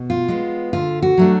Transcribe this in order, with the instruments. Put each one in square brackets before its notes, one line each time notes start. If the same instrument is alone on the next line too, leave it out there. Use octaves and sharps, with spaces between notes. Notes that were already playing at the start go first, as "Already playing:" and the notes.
Already playing: [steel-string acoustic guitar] B2
F4
G#3 B3
D3 F4
F#4
F#3 A3 D4